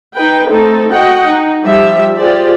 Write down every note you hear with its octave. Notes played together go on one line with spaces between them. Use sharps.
D#4 B4 G5
A3 C4 D#4 A4
F#4 D#5 F#5 G5
D#4
F3 G3 G4 E5
F4 G4 G#4 C5 D5